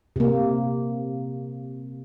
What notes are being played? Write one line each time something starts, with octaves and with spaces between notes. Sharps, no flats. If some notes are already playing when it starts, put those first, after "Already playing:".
C3 A#3